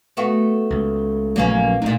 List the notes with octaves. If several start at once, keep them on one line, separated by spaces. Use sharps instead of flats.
A3 B3 F#4
C#2
A#1 C#3 F#3 A#3 B3 C#4
A#2 A3 D4 D#4